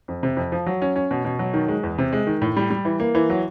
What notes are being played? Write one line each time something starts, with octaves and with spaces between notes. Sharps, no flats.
F2
C3
F2
F3
F#3
C#4
C#4
B2
B2
F#3
D#3
G#3
E2
C3
G#3
D#3
A2
G3
G3
E3
A#3
E3
F#3